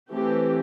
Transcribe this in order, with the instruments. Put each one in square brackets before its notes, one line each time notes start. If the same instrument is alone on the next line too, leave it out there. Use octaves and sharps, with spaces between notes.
[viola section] E3 A3 C4 G4